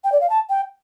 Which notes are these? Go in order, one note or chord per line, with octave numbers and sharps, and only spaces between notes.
G5
D5
F5
A5
G5